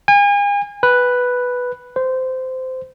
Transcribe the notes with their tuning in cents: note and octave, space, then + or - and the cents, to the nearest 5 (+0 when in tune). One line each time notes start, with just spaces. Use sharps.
G#5 -40
B4 +0
C5 -20